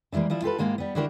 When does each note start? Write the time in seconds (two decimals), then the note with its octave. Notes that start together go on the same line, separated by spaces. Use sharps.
0.12 D3 E3 G3 G#3 A#3
0.30 F3 G3 E4
0.42 F4 G4 A4 B4
0.59 G#2 G#3 A#3 F4 G4
0.78 G3 B3
0.95 D3 D4 E4 F#4 G4 A#4